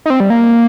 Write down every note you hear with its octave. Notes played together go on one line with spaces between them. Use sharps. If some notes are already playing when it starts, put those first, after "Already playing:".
D#4
C4
G3
A#3